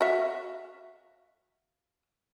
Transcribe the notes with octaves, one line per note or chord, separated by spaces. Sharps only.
F#4 E5 F5